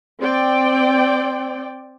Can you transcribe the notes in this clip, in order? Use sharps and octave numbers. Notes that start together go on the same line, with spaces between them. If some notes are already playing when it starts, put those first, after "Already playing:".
C4 D5 G5